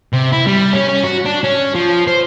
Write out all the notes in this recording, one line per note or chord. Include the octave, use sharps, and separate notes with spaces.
C3
E4
G3
C#4
C#4
F#4
D4
C#4
F3
C5